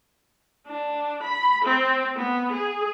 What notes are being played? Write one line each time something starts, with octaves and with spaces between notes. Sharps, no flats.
D4
B5
C4
B3
G#4